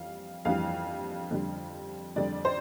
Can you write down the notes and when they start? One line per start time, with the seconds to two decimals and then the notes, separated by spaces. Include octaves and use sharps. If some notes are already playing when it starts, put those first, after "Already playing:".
Already playing: F2 E3 G3 F5
0.45 F2 E3 G3 F5
1.31 F2 D3 G3
2.16 F2 D3 G3 D5
2.45 C5